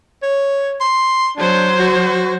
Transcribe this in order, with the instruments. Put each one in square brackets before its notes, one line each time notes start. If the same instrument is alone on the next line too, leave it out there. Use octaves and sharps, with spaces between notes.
[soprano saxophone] C#5
C6
[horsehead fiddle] F#3 C5 [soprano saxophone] D4
[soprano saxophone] F#4